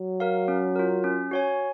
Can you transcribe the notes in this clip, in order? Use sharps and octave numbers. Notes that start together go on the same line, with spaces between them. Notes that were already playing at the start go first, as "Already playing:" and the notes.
Already playing: F#3
A#4 F5
C#4
F4 A#4
C#4
F#4 C#5 G#5